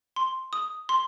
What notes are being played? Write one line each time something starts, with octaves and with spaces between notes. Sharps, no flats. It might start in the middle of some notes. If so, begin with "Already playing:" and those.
C6
D#6
C6